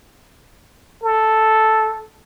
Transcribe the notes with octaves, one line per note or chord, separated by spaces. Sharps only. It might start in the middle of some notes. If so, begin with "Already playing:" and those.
A4